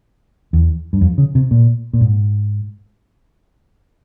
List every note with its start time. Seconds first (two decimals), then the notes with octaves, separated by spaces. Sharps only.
0.53 E2
0.93 G2
1.01 F2
1.18 C#3
1.35 C3
1.51 A#2
1.93 A#2
2.01 G#2